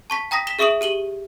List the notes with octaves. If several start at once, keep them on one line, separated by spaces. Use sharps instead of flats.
A5 C#6 B6
G5 A#5 D#6 A#6 B6
B6 E7 G7
G#4 E5 C#6 D#6 D7 F#7
G4 D#7 F#7 G7